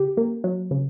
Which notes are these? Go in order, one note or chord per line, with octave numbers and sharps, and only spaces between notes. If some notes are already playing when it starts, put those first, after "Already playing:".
Already playing: C#3 G4
A#3
F#3
C#3